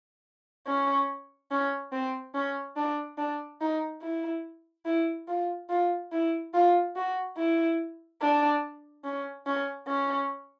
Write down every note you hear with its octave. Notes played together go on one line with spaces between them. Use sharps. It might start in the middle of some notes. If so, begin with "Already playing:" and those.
C#4
C#4
C4
C#4
D4
D4
D#4
E4
E4
F4
F4
E4
F4
F#4
E4
D4
C#4
C#4
C#4